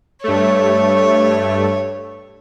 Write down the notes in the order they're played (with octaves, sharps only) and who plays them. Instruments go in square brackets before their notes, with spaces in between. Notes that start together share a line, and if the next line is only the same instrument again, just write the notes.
[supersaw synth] G2 A3 [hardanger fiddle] C#5